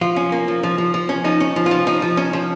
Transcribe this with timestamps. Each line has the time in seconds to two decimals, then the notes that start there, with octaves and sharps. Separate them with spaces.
0.01 F3 F4
0.16 C#4
0.32 A#3
0.48 F3
0.63 F3
0.78 F3
0.94 F3
1.09 C#4
1.24 F3 D#4
1.40 C#4
1.56 F3
1.66 F4
1.71 F3
1.87 F3 D#4
2.02 F3
2.17 C#4
2.33 F3